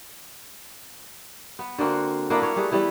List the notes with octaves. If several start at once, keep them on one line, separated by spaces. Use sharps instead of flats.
B3
D3 A#3 C4 F#4
A#3 B3 D4 E4
A#3 C#5
G3 A3 G#4 B4
E3 G3 B3 E4